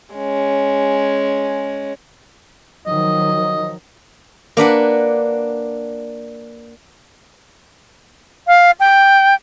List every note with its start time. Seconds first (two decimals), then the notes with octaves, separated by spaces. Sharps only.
0.16 G#3 C#4
2.86 D#3 F3 F#3 D#5
4.57 A#3 D4 B4 F#5
8.47 F5
8.80 G5